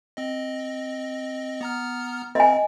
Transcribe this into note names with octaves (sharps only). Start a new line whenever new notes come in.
C4 D#5
B3 A#5 F6
C4 D#5 E5 G#5